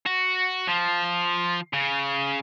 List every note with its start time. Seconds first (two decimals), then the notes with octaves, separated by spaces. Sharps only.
0.06 F#4
0.68 F3
1.73 C#3